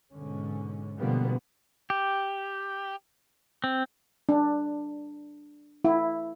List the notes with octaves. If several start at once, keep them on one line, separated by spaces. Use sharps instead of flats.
G#2 B2 D3 C#4
B2 D3 F3 G3 A#3 B3
G4
C4
D4
E4